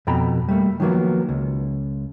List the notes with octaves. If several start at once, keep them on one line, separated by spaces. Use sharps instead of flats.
F2 B2 G5 A#5 B5
G3 A3 A#3
D#3 F3 F#3 A#3 B3
C#2